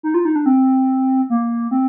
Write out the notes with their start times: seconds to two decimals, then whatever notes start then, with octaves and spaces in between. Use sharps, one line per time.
0.03 D#4
0.14 F4
0.25 D#4
0.36 D4
0.46 C4
1.30 A#3
1.71 C4